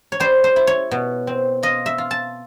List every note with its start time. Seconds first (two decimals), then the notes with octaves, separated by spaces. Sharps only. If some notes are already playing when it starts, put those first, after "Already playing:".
0.12 C#5
0.20 G3 C5
0.44 C5
0.56 E4
0.67 C#5
0.91 B2
1.27 C4
1.63 F4 D#5
1.86 E5
1.98 F4
2.11 A5